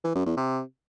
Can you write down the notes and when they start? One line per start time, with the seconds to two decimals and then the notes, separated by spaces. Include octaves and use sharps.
0.04 E3
0.15 F#2
0.26 E2
0.37 C3